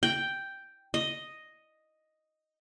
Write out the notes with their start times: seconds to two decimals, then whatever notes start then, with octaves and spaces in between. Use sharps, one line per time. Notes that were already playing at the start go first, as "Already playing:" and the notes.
0.03 G5
0.94 D#5